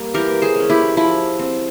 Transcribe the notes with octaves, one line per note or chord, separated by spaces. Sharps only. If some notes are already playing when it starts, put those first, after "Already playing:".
Already playing: G3 A#3
E3 G4 A#4
G#4 C5
G#3 C#4
E4 G4
F3 E4
C4